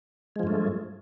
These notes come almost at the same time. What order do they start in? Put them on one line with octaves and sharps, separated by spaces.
G#3 F3 G2 A3